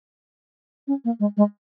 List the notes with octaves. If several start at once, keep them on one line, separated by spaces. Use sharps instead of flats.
C#4
A#3
G#3
G#3